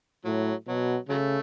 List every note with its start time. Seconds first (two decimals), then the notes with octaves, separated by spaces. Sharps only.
0.25 A2 F#3
0.68 B2 F#3
1.09 C#3 F#3 A3